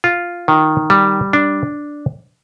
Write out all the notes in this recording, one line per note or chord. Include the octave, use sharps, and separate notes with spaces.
F4
D#3
G3
D4